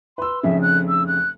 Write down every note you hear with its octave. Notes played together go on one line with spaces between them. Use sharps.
B4 C6 E6
F1 F2 C#3 E5
F#6
E6
F#6